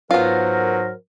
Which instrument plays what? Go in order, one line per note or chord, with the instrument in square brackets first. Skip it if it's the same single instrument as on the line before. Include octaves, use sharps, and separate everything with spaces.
[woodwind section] G#2 A#4 C5 [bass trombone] F#3 [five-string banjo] B3 F4